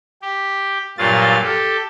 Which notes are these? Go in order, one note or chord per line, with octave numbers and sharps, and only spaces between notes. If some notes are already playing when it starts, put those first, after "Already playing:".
G4
G2 A#2 F#3 F4 A6
G4 A4